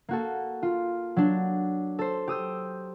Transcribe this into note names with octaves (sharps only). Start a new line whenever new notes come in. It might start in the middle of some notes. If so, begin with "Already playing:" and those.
A#3 F#4 A4
F4
F#3 D4
A4 C5
G4 D#6 E6 G6